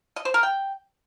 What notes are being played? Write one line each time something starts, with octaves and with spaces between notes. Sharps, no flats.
D#5
C5
A#4
G5